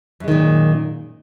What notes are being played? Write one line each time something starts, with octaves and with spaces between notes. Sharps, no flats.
F#2 A#2 D#3 G#3